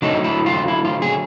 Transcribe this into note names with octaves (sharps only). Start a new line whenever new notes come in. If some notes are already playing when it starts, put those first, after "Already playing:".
D3 F#3 A3 D#4
E4
F4
E4
F4
G#4